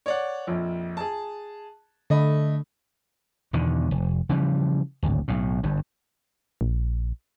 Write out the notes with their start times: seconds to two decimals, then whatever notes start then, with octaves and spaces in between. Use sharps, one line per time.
0.06 C#5 D5 F#5
0.47 A#1 F2
0.97 G#4 A5
2.10 D3 A3 D#5 B5
3.53 E2 B2 D3 D#3
3.91 F1
4.29 C#3 E3 F3 G3
5.03 D1 G#1 D2
5.28 B1 A2
5.63 G1 G2
6.61 A#1